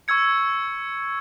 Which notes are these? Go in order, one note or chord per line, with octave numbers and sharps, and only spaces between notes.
C#6 E6 G#6 C#7